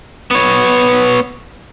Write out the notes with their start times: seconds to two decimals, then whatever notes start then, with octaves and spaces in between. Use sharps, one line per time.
0.31 B3 C#5